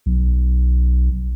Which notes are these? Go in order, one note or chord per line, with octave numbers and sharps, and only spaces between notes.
B1